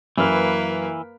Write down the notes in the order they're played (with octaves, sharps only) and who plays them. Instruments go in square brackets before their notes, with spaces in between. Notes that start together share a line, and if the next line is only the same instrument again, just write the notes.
[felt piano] F#2 F6 [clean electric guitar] E3 [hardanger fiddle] A#3 B4